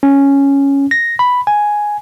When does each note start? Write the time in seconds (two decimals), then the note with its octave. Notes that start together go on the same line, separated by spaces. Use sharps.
0.03 C#4
0.91 A#6
1.19 B5
1.47 G#5